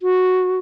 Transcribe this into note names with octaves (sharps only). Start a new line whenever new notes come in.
F#4